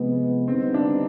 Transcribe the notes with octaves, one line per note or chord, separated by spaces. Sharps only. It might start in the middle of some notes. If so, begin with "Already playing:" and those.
Already playing: C3 F3 G#3 B3
D3 G3 B3 C4 D#4
D4